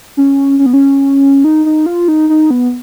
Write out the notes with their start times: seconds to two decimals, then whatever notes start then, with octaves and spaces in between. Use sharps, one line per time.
0.17 C#4
0.59 C#4
0.66 B3
0.73 C#4
1.44 D#4
1.66 D#4
1.86 F4
2.08 D#4
2.29 D#4
2.50 B3